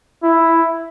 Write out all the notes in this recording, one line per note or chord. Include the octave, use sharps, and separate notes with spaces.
E4